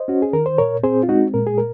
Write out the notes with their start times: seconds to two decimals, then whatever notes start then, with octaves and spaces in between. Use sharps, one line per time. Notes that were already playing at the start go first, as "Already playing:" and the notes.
Already playing: C5 D#5
0.08 C#4 F#4
0.22 G#4
0.33 D#3 A#4
0.46 C5
0.58 A#2 A#4 C#5
0.83 C4 G#4 C5
1.03 F4
1.09 G#3 D#4 F#4
1.34 A#2 A#4
1.47 G#4
1.58 A#4